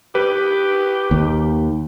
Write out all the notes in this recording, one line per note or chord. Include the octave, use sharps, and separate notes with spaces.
G4 B4
D#2